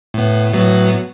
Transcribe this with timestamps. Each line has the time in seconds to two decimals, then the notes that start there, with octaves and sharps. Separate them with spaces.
0.14 A2 B3
0.53 A2 F#3 B3